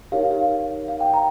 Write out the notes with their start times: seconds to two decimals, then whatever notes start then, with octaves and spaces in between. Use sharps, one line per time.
0.12 D#4 G4 A#4 C#5 F5
0.31 F5
0.88 F5
1.01 G5
1.14 A#5